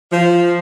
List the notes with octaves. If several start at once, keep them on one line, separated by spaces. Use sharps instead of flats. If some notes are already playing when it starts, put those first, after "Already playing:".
F3